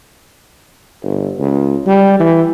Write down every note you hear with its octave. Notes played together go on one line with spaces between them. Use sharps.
G1
C#2
G3
E3